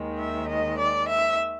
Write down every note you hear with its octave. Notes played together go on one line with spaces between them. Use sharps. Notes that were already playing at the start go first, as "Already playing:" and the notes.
Already playing: D#2 D#3 G#3
E5
D#5
D5
E5